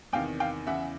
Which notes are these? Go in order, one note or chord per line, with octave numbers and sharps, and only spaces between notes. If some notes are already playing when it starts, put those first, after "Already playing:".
E2 C3 D#3 F5 G5
F5 G5
E2 C#3 E3 E5 F#5